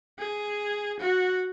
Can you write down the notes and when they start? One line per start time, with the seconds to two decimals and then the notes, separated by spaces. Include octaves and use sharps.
0.18 G#4
0.99 F#4